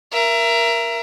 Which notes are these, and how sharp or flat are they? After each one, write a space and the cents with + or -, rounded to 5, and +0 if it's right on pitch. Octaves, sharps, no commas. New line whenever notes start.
A#4 +10 E5 +25